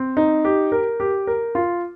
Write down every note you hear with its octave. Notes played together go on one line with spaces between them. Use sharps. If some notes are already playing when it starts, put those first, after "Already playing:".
Already playing: C4
D#4
G4
A#4
G4
A#4
F4